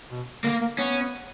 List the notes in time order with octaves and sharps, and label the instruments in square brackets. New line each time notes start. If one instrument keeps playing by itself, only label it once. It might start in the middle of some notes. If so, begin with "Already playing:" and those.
[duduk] B2
[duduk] D3 [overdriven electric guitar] A#3
[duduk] A#3
[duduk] B3 [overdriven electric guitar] C#4